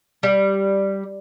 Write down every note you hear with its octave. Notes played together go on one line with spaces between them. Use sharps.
G3